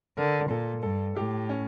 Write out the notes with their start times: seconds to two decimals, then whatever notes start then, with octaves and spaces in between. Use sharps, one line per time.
0.17 D3 A#4
0.50 A#2 A4
0.83 G2 A4
1.17 A2 G4
1.49 C#4